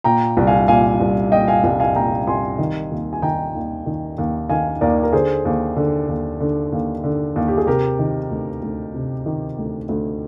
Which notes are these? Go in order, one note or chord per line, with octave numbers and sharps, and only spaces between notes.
A#2 G5 A#5
C2
F5 G#5
A#2 F5 G#5
C2
A#2 D#5 G5
F5 G#5
C2
F5 G#5
A#2 G5 A#5
C2 G#5 C6
D#3
D#2
G#5
D#3 G5 A#5
D#2
D#3
D#2
D#3 F5 G#5
D#2 A#4 D5
A#4
D3 G#4 C5
D#2
D3
D#2
D3
D#2
D3
D#2
G4
G#4
C3 G4 A#4
D#3
D2
D2
C3
D#3
D2
D2